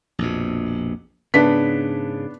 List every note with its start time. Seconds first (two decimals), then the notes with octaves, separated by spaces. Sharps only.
0.19 A#1 F2 B2
1.34 G#2 C#3 B3 D4 B6